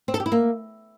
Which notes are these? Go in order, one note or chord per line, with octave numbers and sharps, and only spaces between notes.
C4
A4
G4
E4
A#3